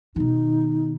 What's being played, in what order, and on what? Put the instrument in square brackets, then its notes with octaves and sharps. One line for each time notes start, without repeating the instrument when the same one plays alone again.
[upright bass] B2 D#3 [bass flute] D#4